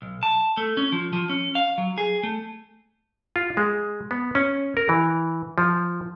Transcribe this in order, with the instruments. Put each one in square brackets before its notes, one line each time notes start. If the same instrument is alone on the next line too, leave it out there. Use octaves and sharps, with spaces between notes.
[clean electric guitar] B1
A5
A3
C#4
F3
F3
C#4
F5
F#3
G#4
A3
[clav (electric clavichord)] F4
G#3
B3
C#4
A#4
E3
F3